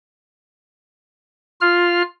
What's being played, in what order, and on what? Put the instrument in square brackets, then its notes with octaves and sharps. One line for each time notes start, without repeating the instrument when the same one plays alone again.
[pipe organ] F4 F6